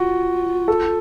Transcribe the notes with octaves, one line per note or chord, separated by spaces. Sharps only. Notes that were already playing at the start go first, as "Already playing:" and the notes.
Already playing: F4 F#4
A4